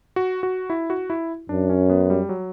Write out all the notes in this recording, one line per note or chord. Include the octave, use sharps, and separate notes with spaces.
F#4
F#4
E4
F#4
E4
F#2 D4
C#4
B3
G3
F#3